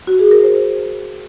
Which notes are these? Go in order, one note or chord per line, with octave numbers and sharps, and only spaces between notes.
F#4
G#4
A#4
C5